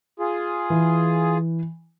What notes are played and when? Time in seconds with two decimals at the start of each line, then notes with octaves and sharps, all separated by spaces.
0.20 F4 G#4
0.70 E3